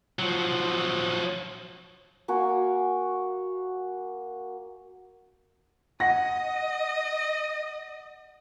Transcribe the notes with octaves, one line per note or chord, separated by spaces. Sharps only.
F3 F#3
A#3 F#4 G#5
D#5 F#5 A#6